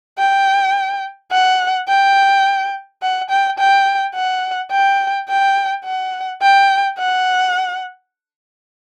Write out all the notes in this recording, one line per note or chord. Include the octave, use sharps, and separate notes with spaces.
G5
F#5
G5
F#5
G5
G5
F#5
G5
G5
F#5
G5
F#5